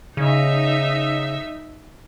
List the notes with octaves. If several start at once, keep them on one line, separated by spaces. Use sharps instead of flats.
C#3 D#4 E5